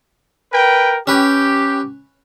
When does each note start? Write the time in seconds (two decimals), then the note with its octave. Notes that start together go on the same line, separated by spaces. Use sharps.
0.53 A#4 B4 G5
1.07 C#4 G4 B4